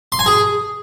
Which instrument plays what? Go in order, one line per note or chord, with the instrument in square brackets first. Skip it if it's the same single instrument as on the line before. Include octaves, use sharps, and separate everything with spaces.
[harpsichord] C6
G#5
G#4